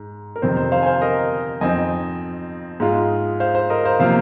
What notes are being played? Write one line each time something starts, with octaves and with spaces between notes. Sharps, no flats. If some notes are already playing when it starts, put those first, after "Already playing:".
Already playing: G#2
A#4
F2 C3 D#3 C4 C5
C5
C5 F5
G#5
C5 F5
A#4 D#5
F2 F3 C4 D#4 D#5 G#5
G#2 G#3 F4
C5 F5
C5
A#4 D#5
C5 F5
C3 F3 A#3 F4 C5 F5